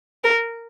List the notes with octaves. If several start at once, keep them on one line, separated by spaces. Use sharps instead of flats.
A#4